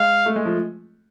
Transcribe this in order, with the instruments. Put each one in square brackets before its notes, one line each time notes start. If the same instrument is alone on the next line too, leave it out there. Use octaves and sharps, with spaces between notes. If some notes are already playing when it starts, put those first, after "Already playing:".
Already playing: [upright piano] G#3 [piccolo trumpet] F5
[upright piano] A3
G#3
F3